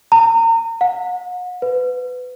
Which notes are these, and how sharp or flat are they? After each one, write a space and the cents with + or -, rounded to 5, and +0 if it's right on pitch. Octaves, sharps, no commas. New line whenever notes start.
A#5 -35
F#5 -40
B4 +20